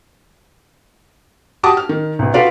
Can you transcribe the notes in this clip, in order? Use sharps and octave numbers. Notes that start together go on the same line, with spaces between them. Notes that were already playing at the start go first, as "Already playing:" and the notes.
F#4 G4 A5 D6 D#6
F6
D#3
C2 B2
F4 F#4 A4 B4 D5 F5